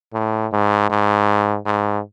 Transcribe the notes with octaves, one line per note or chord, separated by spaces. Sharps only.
A2
G#2
G#2
G#2